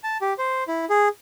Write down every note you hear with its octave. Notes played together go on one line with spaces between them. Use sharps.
A5
G4
C5
E4
G#4